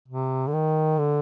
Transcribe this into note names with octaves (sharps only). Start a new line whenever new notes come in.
C3
D3
D#3
D3